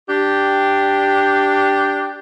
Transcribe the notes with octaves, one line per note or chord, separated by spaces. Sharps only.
D4 G4